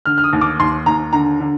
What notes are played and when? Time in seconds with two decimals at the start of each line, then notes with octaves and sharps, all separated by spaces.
0.06 D3 F6
0.18 F6
0.24 D#6
0.33 D#2
0.41 D6
0.60 D#2 C6
0.86 D#2 A#5
1.13 D3 A#5
1.40 D3